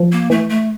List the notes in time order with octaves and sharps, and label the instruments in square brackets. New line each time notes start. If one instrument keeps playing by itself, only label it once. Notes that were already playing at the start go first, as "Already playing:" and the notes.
Already playing: [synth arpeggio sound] F3
[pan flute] A#3
[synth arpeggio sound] E3 [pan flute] A3
[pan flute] A3